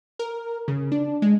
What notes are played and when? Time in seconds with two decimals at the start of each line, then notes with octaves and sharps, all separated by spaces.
0.19 A#4
0.68 C#3
0.92 D4
1.22 G#3